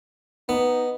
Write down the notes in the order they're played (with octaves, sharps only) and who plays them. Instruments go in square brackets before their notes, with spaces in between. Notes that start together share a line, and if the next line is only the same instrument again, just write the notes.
[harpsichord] B3 [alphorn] D#4